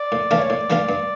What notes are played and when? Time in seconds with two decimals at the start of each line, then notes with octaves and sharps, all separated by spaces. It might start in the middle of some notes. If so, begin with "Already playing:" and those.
Already playing: D5
0.12 A2
0.31 E3 A3 D4 F4
0.39 C#5
0.50 A2 D5
0.70 E3 A3 D4 F4
0.89 G2